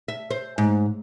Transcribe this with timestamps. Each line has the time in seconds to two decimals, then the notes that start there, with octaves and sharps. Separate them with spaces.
0.08 E5
0.31 C5
0.58 G#2